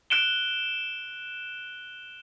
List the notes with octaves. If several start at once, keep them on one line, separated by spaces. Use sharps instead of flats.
F#6 D7 E7 G7